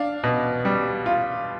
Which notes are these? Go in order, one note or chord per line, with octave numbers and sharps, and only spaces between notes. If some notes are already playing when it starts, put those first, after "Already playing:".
Already playing: D4 F5
B2
G3
F4